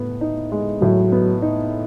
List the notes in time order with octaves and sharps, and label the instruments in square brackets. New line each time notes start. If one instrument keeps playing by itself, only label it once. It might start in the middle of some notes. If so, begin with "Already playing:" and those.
Already playing: [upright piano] A2 B3
D#4
G#3
[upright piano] A2 [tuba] F#3
[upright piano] B3
D#4